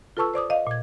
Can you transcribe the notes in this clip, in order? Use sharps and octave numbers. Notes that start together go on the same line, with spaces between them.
F4 A4 B4 A5 C#6 E6
C5 D5 D6 D#6
D#5 F5
A#2 G#6